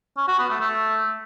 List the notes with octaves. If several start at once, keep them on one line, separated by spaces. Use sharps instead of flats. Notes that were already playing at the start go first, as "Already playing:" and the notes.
C#4
F#4
B3
A3
A3